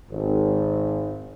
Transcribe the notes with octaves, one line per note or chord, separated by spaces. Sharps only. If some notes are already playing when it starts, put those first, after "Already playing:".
G#1